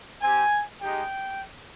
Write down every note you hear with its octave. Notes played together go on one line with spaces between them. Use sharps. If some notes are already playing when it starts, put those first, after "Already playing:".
C4 G4 G#5
G#3 D#4 G4 G5